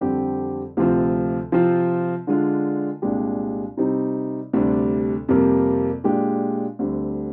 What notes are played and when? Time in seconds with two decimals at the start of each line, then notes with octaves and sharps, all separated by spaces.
0.01 F2 D3 G3 C4 G4
0.77 D2 C3 F3 C4 F4
1.52 C3 F3 C4 F4
2.27 D3 G#3 D4 F4
3.02 C2 A#2 G#3 D4 G4
3.77 C3 G3 C4 D#4
4.53 D2 C3 G3 D4
5.29 F2 C3 G3 A#3
6.04 A#2 G#3 D4 G4
6.79 D2 D3 G3 C4